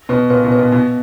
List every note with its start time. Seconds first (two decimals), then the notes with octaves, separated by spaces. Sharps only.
0.09 B2 B4
0.30 A#2 B4
0.44 B2
0.52 B4
0.59 B2
0.72 B2 D#4